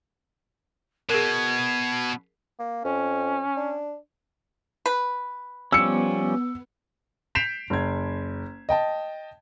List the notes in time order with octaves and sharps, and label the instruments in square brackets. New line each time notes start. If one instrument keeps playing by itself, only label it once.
[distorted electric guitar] B2 [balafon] G#4 A#4 [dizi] G#6
[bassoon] A#3
[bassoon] F2 [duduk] C#4
[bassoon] D4
[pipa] B4
[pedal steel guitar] F3 G3 C#4 [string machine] B3 [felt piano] E6 C#7
[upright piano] G6 B6 C7 D7 E7 F7
F#1 G#6
D#5 G5 A5